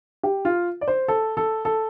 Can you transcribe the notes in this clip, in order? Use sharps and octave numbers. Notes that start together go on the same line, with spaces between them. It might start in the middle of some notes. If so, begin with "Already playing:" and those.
G4
F4
D5
C5
A4
A4
A4